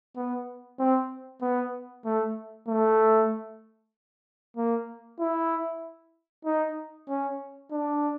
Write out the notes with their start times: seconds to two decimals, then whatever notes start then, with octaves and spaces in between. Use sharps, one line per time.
0.16 B3
0.79 C4
1.41 B3
2.05 A3
2.68 A3
4.57 A#3
5.20 E4
6.45 D#4
7.09 C#4
7.71 D4